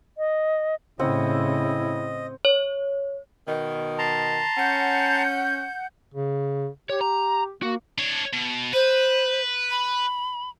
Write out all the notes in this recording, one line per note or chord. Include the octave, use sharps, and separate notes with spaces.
D#5
A2 C#3 C4 E4 D#5 F#5
C#5
B2 D#3
A5 A#5 C6
C#4 F#5 G6
C#3
G4 C#5
A#5
A#3 F#4
D4 C#5
B2
B4 C5
B5